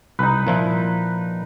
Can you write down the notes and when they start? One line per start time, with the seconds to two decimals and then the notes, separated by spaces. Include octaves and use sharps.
0.19 C2 D#4 B4
0.47 A#2 F3 E4